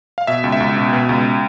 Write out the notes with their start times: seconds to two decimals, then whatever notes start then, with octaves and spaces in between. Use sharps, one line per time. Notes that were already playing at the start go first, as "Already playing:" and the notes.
0.18 F5
0.27 B2 E5
0.44 C#2
0.52 E5
0.60 C#2
0.77 B2
0.93 B2
1.09 C#2